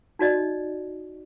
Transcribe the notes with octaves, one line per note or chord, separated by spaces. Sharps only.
D#4 F#4 D5 D#5